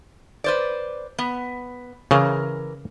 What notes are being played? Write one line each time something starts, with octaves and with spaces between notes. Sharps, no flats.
B4 C5 D5
B3
C#3 E3 A#4